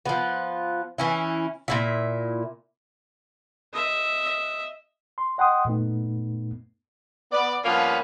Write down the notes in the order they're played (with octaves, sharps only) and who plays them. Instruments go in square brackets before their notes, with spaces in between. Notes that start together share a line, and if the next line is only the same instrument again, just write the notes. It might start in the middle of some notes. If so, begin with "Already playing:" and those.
[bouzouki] F3 B3
E3 C#4 E4
A#2 E4 E5
[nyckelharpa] D#5 E5
[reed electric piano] C6
D#5 F#5 G5 C6 D#6
F#2 A#2 A3 B3 D#4
[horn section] B3 D5
G2 F3 A#3 B3 C#4